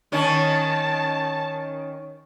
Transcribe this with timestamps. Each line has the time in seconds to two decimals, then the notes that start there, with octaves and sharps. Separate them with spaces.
0.12 D#3 C#4 A5